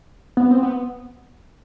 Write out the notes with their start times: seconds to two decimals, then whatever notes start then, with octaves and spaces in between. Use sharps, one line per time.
0.37 B3
0.51 C4
0.63 B3